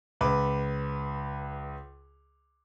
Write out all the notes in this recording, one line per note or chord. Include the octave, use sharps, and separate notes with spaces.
C#2 B4 D6